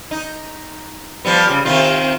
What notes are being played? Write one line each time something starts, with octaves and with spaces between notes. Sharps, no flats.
D#4
F3 G3 B3
C#3 G3
C3 D#3 F4